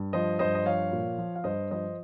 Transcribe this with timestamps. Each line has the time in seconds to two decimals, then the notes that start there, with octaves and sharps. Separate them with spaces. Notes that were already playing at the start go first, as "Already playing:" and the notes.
Already playing: G2
0.13 F3 C5 D#5
0.39 G2 C5 D#5
0.55 D#5
0.65 F3 C#5 F5
0.92 A#2
1.18 F3
1.36 F5
1.44 G2 C5 D#5
1.71 F3 C5 D#5